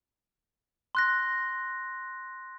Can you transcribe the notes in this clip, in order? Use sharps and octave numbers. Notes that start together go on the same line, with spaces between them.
C6 F#6 A#6